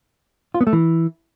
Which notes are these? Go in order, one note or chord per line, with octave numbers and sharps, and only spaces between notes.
F4
B3
A3
E3